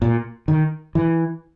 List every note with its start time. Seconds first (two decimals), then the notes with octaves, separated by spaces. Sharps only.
0.02 A#2
0.48 D#3
0.95 E3